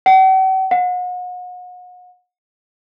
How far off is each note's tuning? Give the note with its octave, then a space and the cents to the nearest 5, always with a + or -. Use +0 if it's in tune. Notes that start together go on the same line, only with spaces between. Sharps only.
F#5 +45
F#5 -40